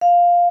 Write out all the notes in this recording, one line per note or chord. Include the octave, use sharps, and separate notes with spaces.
F5